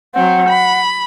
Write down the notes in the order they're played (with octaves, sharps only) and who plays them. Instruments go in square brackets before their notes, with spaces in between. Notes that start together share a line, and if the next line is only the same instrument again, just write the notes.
[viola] F#3 C4 [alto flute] F#5
[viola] B5